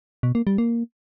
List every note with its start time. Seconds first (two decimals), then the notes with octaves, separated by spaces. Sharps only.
0.23 B2
0.35 A#3
0.47 G3
0.58 A#3